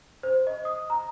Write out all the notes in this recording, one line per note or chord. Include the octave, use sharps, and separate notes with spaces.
C5
D#5
D#6
A#5